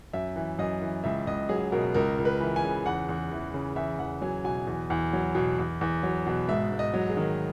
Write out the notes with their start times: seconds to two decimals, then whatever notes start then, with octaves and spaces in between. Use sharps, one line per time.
0.13 F#2 E5
0.36 E3
0.59 F#2 D#5
0.82 E3
1.04 C#2 E5
1.27 C#2 D#5
1.49 F#3 G#4
1.72 B2 A#4
1.94 C#2 A#4
2.18 C#2
2.25 B4
2.40 E3
2.56 G#5
2.63 C#3
2.86 E2 F#5
3.09 E2
3.31 E3
3.54 C#3
3.76 E2 E5
3.99 E2 F#5
4.22 F#3 G#5
4.44 B2 G#5
4.67 E2
4.90 E2
5.13 F#3
5.35 B2
5.59 E2
5.81 E2
6.03 F#3
6.27 B2
6.48 G#2 E5
6.72 G#2
6.79 D#5
6.94 F#3
7.09 G#4
7.17 D#3